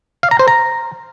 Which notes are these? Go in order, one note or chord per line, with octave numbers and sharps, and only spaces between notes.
F5
A#5
C5
A#5